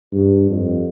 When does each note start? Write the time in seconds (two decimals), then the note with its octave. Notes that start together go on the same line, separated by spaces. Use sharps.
0.12 G2
0.50 F2